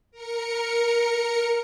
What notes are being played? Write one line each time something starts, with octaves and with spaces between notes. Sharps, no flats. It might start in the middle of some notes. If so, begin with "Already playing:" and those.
A#4 C#7